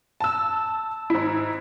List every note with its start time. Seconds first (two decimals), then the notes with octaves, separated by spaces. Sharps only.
0.20 A5 E6
1.10 G#2 E4